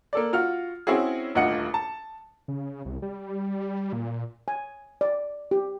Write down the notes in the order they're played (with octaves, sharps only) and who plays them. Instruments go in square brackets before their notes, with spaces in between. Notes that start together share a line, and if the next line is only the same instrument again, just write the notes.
[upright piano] A#3 A4 D5
F4 F#4 F6
C4 C#4 E4 F#4 G#4
D#1 D2 F4 D#5 F#5 C#7
A5
[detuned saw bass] C#3
C2
G3
A#2
[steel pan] G#5
D5
G4